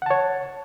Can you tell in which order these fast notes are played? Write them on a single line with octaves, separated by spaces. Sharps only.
F#5 A5 C#5